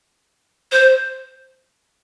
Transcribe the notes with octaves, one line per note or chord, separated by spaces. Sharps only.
C5